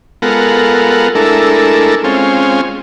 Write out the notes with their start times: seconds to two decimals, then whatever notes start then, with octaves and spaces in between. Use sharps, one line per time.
0.22 G#3 B3 F4 A4 A#4 F#5
1.15 G#3 A3 D4 E4 A4 A#4
2.04 G#3 C4 C#4 F4